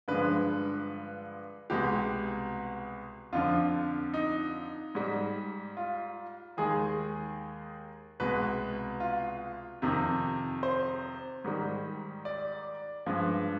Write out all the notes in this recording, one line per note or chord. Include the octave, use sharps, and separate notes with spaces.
G2 D3 F3 G#3 B4
C2 B2 G#3 G4
F2 D3 F3 F4
D#4
G#2 G3
F4
D#2 D#3 G#3 G#4
C2 B2 G#3 B4
F4
F2 C3 D#3
C5
G#2 D#3 G3
D5
G2 F3 G#3